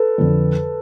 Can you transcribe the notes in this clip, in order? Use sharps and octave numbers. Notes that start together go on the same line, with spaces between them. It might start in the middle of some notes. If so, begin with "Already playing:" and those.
Already playing: A4 B4
F2 D3